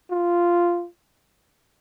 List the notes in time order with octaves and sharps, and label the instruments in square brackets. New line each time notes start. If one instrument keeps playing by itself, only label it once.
[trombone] F4